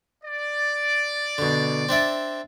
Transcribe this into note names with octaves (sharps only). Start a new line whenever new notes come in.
D5
B2 D3
C4 D4 E5